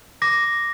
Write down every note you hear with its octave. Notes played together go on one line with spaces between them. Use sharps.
D6 A#6